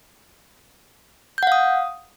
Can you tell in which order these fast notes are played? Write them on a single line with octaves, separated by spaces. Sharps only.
G6 F#5 F5 D#6